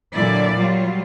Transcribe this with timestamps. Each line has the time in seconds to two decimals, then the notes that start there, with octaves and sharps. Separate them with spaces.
0.14 A#2 D3 F#3 E4 D5
0.56 F#3 G3 F4